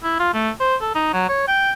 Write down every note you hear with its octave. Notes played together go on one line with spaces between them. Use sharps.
E4
F4
A3
C5
A4
D#4
F#3
C#5
G5